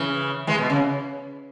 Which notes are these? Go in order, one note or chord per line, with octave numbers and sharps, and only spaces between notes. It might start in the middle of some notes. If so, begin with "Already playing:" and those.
Already playing: C#3 E3
E3 G#3
B2
C#3